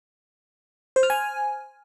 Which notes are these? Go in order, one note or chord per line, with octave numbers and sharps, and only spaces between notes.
C5
F6
G#5